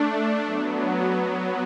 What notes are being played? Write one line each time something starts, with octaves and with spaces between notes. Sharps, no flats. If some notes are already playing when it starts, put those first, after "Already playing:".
Already playing: A3 D4
F#3 B3